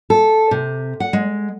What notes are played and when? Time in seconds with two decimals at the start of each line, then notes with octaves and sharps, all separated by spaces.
0.10 A4
0.51 C3
1.00 F#5
1.13 G#3